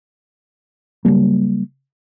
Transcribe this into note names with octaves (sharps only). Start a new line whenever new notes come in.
C#3 F#3 G3 A#3